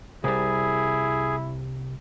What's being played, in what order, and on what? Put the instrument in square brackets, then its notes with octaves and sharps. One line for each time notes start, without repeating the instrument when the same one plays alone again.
[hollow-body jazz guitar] C2 G3 [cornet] E4 [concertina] G#4